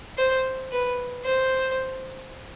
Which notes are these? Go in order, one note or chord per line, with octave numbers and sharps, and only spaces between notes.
C5
B4
C5